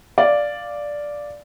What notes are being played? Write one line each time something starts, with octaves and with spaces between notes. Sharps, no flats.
D5 F5